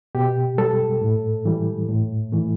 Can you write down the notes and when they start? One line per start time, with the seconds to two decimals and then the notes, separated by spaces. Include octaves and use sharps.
0.15 B2 G4
0.58 G3 A4
1.01 A2
1.46 E3 G3
1.89 A2
2.32 E3 A3